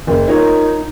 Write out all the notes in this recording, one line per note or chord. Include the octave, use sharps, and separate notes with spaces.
F#1
D#4 F4 A#4 C#5